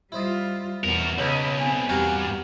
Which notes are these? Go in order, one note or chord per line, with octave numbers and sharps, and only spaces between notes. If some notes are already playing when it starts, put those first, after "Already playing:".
G3 E4 F4 C5 D#5
E2 B2 F#4 A#4
B1 C#3 D4 B4 D#5
B3 C4 G#5
E2 G2 F#4 G4 A#4